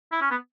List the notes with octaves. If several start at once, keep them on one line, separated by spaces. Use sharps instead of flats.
E4
C#4
B3